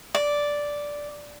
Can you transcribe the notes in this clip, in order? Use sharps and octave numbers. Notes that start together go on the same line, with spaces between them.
D5